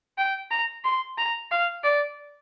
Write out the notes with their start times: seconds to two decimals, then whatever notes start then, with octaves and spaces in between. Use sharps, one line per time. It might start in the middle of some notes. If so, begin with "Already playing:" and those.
0.18 G5
0.51 A#5
0.84 C6
1.18 A#5
1.51 F5
1.84 D5